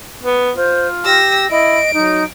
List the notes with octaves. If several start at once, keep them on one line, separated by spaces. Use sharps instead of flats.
B3
F4 C5
G4 E6 A#6
E4 D#5 D7
F#3 D#4